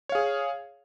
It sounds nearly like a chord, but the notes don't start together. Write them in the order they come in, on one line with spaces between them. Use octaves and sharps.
C#5 F5 G#4